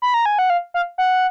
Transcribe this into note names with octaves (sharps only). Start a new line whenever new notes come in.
B5
A#5
G#5
F#5
F5
F5
F#5